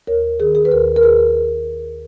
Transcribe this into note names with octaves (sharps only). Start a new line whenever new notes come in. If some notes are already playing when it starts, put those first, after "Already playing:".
D#2 A#4 C#5
D#3 G#4
G#4
B4
D#2 A#4
A#4
D#2 G#4 B4